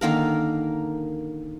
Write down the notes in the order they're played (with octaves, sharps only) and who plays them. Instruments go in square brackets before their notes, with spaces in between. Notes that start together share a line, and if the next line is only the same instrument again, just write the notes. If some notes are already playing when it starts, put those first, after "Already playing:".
[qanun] D3 D#3 A#3 A#4